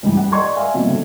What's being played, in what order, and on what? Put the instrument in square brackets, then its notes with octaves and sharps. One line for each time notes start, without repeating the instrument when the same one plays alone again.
[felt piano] C#2 G2 E3 G3 G#3
G3 F#5
D5 D#5 C6 C#6 G#6
E5 F5 G#5
B2 F3 G3 A#3 C4
D3